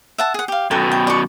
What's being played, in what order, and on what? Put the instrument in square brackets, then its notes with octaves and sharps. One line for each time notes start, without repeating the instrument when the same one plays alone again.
[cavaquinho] E5 F#5 A5
G#4 F#5
G4 F5
[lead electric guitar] F#2 B2 [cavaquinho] A4 G5 C#6
[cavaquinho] G5
D5 C#6